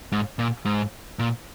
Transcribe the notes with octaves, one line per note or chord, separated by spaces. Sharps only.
G#2
A#2
G#2
A#2